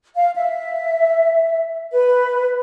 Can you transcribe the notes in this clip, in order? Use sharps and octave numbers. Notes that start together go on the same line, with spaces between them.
F5
E5
B4